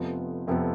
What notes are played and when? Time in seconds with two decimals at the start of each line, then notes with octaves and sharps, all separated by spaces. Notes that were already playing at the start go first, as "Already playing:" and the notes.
Already playing: F1 F2 C3 F3 B3
0.47 F1 F2 C3 F3 B3